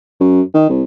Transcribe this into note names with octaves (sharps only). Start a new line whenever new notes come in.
F#2
D#3
C2